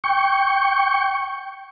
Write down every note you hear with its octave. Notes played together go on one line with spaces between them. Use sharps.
G5 C#6